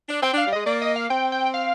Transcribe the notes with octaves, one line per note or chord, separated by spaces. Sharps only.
D4
C4 G5
D4 F5
G3
G#3 D#5
A#3 D5
D#5
F5
C4 G5
G5
F5